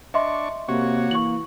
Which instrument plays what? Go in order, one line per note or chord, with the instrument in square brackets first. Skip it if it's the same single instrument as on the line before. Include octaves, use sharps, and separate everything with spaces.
[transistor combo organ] D4 C#6 [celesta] D#5 E5 C6
[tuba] C3 [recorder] A#3 [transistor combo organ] F#4 C#5
[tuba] E3 [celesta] C#6 F#7